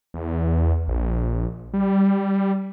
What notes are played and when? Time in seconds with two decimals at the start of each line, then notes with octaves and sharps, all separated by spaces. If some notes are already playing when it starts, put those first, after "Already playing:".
0.14 E2
0.88 A#1
1.73 G3